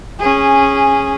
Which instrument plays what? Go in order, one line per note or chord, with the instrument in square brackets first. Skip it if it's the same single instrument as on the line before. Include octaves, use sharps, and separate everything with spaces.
[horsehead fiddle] C#4 G#4